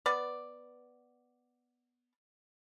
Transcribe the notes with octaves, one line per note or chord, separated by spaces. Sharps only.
B3 D5